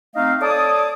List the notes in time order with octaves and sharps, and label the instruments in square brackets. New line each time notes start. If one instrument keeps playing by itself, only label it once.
[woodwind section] A3 C4 D#4 D#5 F5
A4 C#5 D5 A5 D6 D#6